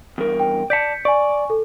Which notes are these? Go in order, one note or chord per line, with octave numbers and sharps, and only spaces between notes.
E2 G2 A#4
G5
D5 A5 G6 B6 C#7
D5 G#5 C#6
A4